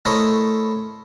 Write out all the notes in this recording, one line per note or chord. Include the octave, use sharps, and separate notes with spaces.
A3 E4 A#4 C5 C#5 D#5